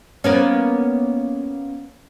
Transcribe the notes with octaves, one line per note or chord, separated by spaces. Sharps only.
A#3 B3 C#4